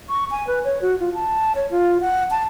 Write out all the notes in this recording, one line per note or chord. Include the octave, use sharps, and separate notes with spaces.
C#6
G#5
B4
C#5
F#4
F4
A5
C#5
F4
F#5
A5